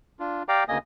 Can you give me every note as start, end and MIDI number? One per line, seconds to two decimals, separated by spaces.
0.19 0.43 62
0.19 0.43 65
0.48 0.64 67
0.48 0.64 74
0.48 0.64 77
0.48 0.64 79
0.48 0.64 82
0.48 0.64 86
0.68 0.78 38
0.68 0.78 49
0.68 0.78 58
0.68 0.78 75
0.68 0.78 80
0.68 0.78 87